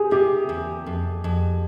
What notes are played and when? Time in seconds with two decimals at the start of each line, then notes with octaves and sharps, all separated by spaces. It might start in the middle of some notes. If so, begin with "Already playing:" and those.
Already playing: G4 G#4
0.11 C3 G4
0.49 E2
0.86 F2
1.24 F2